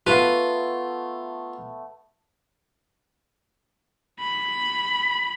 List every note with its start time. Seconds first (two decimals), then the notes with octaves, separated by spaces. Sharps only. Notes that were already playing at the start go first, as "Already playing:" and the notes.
0.07 A3 B3 F4 B4
4.20 B5